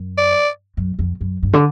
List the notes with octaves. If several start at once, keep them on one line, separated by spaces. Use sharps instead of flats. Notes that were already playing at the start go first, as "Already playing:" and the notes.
Already playing: F#2
D5
F#2
F2
F#2
G2
D3